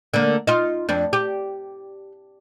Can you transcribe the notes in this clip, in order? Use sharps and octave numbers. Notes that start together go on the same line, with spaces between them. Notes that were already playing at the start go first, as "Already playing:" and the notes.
D3 A#3
D#4 F4
F2 D4
G4